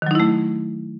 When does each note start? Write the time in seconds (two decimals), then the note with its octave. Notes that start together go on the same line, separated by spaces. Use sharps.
0.02 D#3
0.06 F#3
0.11 D#4
0.15 E4
0.20 A3